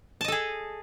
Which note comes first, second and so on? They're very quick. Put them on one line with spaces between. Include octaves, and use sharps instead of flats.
A5 D#5 A4 G#4